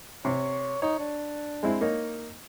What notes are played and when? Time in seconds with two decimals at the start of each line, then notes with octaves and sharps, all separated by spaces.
0.25 C3 C#5
0.82 D#4 C#5
0.99 D4
1.63 G#3 C4 E4
1.81 A#3 D#4 C#5